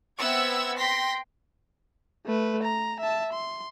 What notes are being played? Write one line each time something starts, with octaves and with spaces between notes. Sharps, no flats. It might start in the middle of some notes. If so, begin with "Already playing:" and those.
B3 C4 E5 F#5 E6 G#6
G5 C6 A#6 B6
A3 B4
A#5
E5 A5
C6